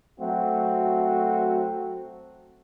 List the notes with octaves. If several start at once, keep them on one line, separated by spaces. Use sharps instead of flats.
F#3 A3 C4 F#4